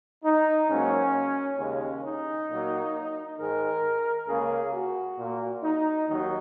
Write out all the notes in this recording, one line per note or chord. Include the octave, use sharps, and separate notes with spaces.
D#4
G#2 F#3 A#3 C#4
D#2 C#3 G#3 C#4
D#4
A#2 F#3 A#3
G#2 D#3 G#3 A#4
C#2 C#3 A#3 G#4
F#4
A#2 A#3
D#4
D#2 D#3 F#3 D#4